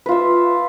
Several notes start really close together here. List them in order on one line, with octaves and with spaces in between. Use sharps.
B4 F4 E5